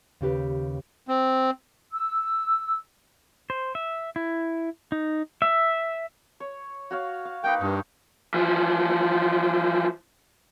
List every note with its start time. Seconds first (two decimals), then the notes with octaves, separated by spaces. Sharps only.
0.21 D#2 C#3 G4 B4
1.08 C4
1.94 E6
3.50 C5
3.75 E5
4.16 E4
4.92 D#4
5.42 E5
6.40 C#5
6.91 F#4 C#5 F5
7.25 F5
7.44 A#3 D#4 B4 G5
7.61 G2 D#4 A#4
8.34 E3 F3